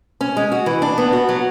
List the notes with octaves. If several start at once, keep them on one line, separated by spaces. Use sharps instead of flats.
C#4
G#3
F#4
E3
D4
B3
F#4
F#3